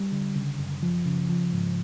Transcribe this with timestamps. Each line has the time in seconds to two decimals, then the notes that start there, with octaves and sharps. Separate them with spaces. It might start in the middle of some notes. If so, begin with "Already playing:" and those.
Already playing: G3
0.12 D3
0.36 C#3
0.59 F#2
0.83 F3
1.05 C#3
1.29 F3
1.53 G#2